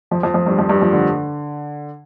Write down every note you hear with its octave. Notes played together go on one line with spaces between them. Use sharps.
F2 F3
F2 F3
F2 F3
G2 G3
F2 F3
G2 G3
F2 F3
D3